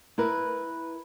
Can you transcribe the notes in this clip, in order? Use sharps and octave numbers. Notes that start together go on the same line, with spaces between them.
E4 A#4 B4